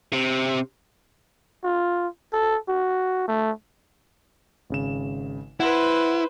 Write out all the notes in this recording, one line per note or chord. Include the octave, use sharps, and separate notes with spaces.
C3
F4
A4
F#4
A3
G#1 C#3 E7
E4 B4 C5 F#5